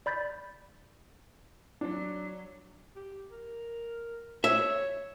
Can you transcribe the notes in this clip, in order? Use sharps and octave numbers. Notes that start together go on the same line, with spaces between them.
D5 B5 G6 A6 B6
F#3 D4
G4
A#4
C#5 E5